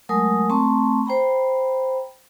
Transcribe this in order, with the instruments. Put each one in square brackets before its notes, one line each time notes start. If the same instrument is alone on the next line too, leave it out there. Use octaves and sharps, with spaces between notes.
[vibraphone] F#3 G#3 A3 A#4 G#5 D#6
A3 C4 A5 A#5 C6 C#6
C5 G5 A#5 B5